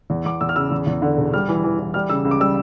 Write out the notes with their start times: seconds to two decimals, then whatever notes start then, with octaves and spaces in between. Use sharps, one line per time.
0.10 E2
0.25 E2 D6
0.41 E2 E6
0.49 F6
0.56 C#3 E6
0.71 E2
0.87 E2
1.02 D3
1.17 E1
1.33 G3 F6
1.49 E3
1.64 E3
1.79 E3
1.94 G3 F6
2.09 C#3 E6
2.25 C#2
2.31 D6
2.40 G3 E6